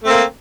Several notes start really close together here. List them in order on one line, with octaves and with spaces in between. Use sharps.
A3 C4 A#3